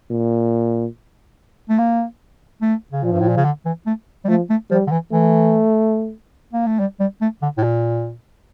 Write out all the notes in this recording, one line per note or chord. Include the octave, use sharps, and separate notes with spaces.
A#2
A3
A#3
A3
C#3
A#2 F3
G2
A2
A#2
C#3
D3
E3
A3
G3
F3 A3
A3
F3 G3
D3
E3
E3 A3
A#3
A3
G3
G3
A3
D3
A2
A#2